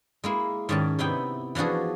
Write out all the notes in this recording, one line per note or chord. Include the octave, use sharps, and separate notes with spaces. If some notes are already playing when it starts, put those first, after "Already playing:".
G#3 A#3 E4
G#2 D#3 C#4 D5 A5
C3 B3 D#4 E4 G5
E3 F3 D4 F#4 G#4